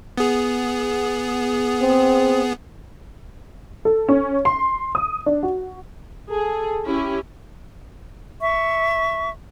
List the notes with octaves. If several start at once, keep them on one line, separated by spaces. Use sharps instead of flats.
B3 G#4
C4
A4
C#4
C6
D#6
D4
F#4
G#4 A4
C#4 E4 G4
E5 C#6